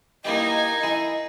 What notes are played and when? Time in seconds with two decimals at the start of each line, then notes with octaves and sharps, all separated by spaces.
0.25 A#3 D#4 E4 G4 D#5 G#5
0.83 E4 G#4